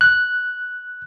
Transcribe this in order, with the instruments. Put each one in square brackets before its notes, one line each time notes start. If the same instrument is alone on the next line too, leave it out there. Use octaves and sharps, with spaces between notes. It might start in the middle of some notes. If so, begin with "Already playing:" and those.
[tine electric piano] F#6